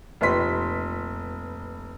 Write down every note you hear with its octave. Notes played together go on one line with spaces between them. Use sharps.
F1 A#2 B4 C6 B6